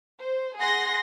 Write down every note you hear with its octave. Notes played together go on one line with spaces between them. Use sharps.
C5
G#4 F#5 C6 A#6